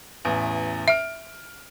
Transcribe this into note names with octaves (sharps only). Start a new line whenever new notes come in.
A1 E2
E5 F6 D7